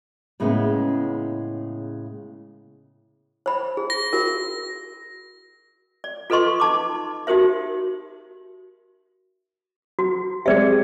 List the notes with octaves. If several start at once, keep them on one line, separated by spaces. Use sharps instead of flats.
A2 C#3 G#3 A#3 B3 C#4
C5 B5
G#4
A#6
F#4 A#4
D5
F4 A4 B4 D#5 C6 C#6
D#4 A5 D6
D#4 F#4 G4 A#4 C5 E5
F#4
G#3 C4 G4 G#4 D5 E5